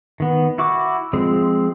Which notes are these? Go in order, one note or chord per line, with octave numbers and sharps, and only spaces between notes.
D#3 B3
E4 F#4 C#6 D6
F3 G#3 C4